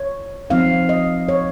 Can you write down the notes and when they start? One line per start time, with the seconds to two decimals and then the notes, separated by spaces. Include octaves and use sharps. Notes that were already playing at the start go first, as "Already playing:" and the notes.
Already playing: C#5
0.50 F3 C4 D#4 F5
0.89 D#5
1.29 C#5